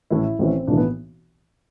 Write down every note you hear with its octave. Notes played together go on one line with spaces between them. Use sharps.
A1 A2 E3 E4
A1 A2 E3 C4
B1 A2 E3 D4
B3